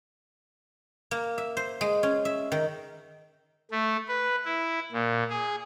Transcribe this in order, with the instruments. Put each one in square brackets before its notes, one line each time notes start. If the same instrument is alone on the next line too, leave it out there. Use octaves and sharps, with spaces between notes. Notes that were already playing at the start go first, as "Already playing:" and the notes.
[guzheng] A#3
E5
C5
G#3
C#4
E5
D#3
[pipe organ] A3
B4
E4
A#2
G#4